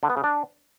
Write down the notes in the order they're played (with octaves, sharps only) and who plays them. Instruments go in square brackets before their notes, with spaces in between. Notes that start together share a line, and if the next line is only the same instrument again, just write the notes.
[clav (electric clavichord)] D3
B3
C#3
D4